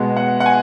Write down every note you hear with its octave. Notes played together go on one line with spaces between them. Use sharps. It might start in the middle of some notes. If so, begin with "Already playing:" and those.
Already playing: B2 G#3 B3
F#5
F#5
G#5